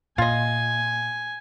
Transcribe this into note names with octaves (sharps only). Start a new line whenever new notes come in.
A#2 F4 D#5 G#5